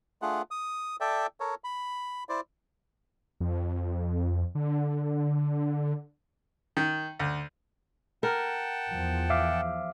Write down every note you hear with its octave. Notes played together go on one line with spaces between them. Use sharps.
A3 D4 F4 G#4 F#5
D#6
A4 D5 E5 G5
A4 A#4 C#5
B5
E4 C5 D5
F2
D3
D#3
D2
A#4 F#5 G5 A5
E2 F3
E5 F5 D6